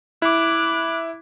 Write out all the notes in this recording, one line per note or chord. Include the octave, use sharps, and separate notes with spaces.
E4 D6 F#6